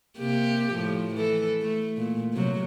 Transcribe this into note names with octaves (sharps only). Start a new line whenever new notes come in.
C3 A#3 G4
A2 F3
E3 A4
A3
A#2
C3 F#3